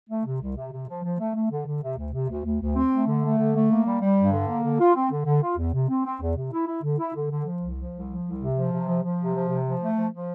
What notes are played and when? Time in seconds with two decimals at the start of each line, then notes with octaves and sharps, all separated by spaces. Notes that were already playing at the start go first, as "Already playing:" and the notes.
0.09 A3
0.25 C3
0.41 C2
0.56 C3
0.72 C3
0.88 F3
1.03 F3
1.19 A3
1.34 A3
1.50 D3
1.66 D3
1.82 C3
1.98 D2
2.13 C3
2.29 D2
2.44 D2
2.60 D2
2.75 C4
2.91 A3
3.07 D3
3.23 A3
3.38 D3
3.54 A3
3.70 A#3
3.86 G3
4.01 G3
4.17 G2
4.32 D3
4.48 A#3
4.63 D3
4.79 F4
4.95 C4
5.11 D3
5.26 D3
5.42 F4
5.57 E2
5.73 C3
5.89 C4
6.05 C4
6.21 E2
6.36 C3
6.52 E4
6.67 E4
6.83 D3
6.98 E4
7.14 D3
7.30 D3
7.45 F3
7.61 C2
7.77 F3
7.93 C2
8.08 F3
8.24 C2
8.40 C3
8.55 F3
8.71 C3
8.86 F3
9.02 F3
9.18 C3
9.34 F3
9.49 C3
9.65 F3
9.81 A3
9.96 F3
10.12 F3